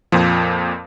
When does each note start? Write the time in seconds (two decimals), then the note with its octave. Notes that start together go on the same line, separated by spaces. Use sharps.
0.12 F2 A#2 F3